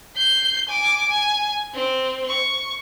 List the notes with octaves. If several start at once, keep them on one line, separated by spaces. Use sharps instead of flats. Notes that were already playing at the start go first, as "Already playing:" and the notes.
G6 C7
G#5 D6
G#5
C4
C#6